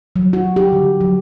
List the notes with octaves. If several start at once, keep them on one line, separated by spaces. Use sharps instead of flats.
F#3
F#4
G4
D3
F#3